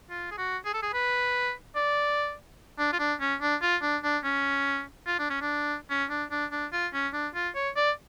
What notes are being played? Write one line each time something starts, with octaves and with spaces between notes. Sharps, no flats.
F4
G#4
F#4
G#4
A4
G#4
B4
D5
D4
F4
D4
C#4
D4
F4
D4
D4
C#4
F4
D4
C#4
D4
C#4
D4
D4
D4
F4
C#4
D4
F4
C#5
D5